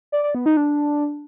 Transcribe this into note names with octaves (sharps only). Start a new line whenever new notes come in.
D5
D5
B3
D#4
D4